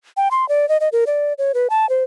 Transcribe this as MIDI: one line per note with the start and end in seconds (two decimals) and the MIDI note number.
0.17 0.28 79
0.31 0.48 84
0.49 0.68 74
0.69 0.77 75
0.81 0.89 75
0.92 1.04 70
1.07 1.33 74
1.38 1.52 73
1.54 1.68 71
1.70 1.89 81
1.89 2.04 72